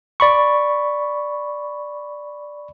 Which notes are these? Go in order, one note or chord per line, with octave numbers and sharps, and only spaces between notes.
D5 B5 C#6